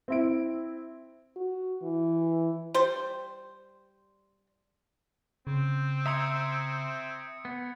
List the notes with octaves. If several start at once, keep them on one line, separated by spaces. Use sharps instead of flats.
C4 E4 D7
F#4
E3
G3 C5
C#3 C4
E5 A#5 C6 D#6 G#6 C#7
B3